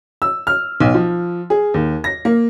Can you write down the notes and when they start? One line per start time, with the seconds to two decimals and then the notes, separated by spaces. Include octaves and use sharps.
0.22 E6
0.47 F6
0.80 B1
0.94 F3
1.50 G#4
1.74 D#2
2.04 A#6
2.25 A#3